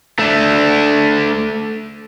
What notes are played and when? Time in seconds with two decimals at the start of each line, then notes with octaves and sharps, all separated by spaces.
0.19 A3 D4